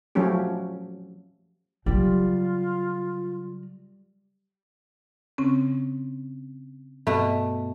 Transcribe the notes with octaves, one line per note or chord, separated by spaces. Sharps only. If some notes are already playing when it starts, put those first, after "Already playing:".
F3 F#3 A3 C#4 G4
C#3 F#3 G3 F4
C#3 C4 C#4
G2 B2 A3